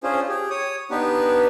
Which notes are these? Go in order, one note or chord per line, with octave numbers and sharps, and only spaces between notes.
C#4 D4 F4 G#4 C5
G4 G#4
C#5 D#6
B3 D4 D#4 G4 B4